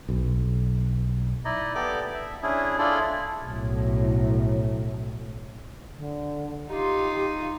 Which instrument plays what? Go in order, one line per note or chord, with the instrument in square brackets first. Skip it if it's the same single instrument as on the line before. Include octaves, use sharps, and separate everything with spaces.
[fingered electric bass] B1
[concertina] D#4 E4 D5 D#5
B3 G4 A4 D5 D6
E5
C#4 D4 E4 G#4
D4 E4 F4 G#4 A4 D5
[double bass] B1 A2
[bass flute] D3
[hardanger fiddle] D#4 F4 [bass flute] G4